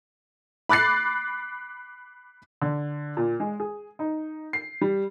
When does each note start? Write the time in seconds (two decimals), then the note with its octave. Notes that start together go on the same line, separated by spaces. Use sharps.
0.69 B5 D6 F#6 A6 C7
2.62 D3
3.17 A#2
3.40 G#3
3.60 G#4
3.99 D#4
4.53 C7
4.81 G3